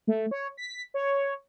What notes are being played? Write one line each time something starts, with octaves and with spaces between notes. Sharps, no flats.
A3
C#5
B6
C#5